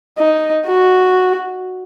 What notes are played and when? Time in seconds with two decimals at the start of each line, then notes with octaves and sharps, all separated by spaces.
0.18 D#4
0.67 F#4